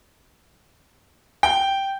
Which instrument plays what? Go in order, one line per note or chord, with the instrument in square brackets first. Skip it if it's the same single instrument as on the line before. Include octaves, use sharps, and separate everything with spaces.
[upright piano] G5